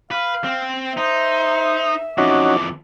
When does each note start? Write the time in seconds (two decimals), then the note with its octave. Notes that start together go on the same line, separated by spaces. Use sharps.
0.11 B4 F5
0.44 C4
0.97 D#4 C5 E5
2.18 F2 E3 C#4 D#4 F#4 D6